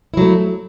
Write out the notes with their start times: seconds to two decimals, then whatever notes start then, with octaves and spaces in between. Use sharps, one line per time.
0.14 E4
0.17 F#3
0.21 A3